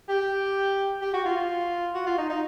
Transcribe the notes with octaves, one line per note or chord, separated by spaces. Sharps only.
G4
G4
F#4
F4
F#4
F4
D#4
D#4